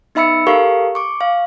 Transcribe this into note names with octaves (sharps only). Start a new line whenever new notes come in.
B3 D#4 E5 B5 E6 C#7
G4 A4 A#4 F5 C#6
C#6 D6
F5